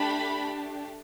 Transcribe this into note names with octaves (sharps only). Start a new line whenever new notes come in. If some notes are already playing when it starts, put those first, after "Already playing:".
Already playing: A3 D4 G4 B5